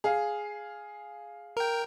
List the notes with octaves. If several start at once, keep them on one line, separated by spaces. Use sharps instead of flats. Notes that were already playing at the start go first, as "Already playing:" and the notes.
G#4 F5
A#4 G5